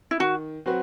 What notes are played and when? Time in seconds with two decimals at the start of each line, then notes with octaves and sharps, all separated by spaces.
0.11 E4
0.19 D#3 F#4
0.66 F#3 C4 F#4 B4